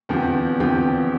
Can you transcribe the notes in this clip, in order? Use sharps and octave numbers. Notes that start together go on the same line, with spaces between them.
E2 D3 F3 C4 G4
E2 D3 F3 C4 G4